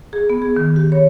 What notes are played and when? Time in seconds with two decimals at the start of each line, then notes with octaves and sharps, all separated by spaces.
0.13 G#4
0.30 B3
0.42 G#4
0.56 D#3
0.76 G4
0.92 C#5